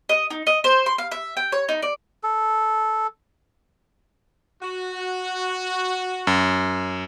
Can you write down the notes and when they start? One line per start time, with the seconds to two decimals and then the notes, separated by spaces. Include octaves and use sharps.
0.09 D#5
0.31 D#4
0.47 D#5
0.64 C5
0.86 C6
0.98 F5
1.11 E5
1.37 G5
1.52 C#5
1.69 D#4
1.82 D5
2.23 A4
4.62 F#4
6.27 F#2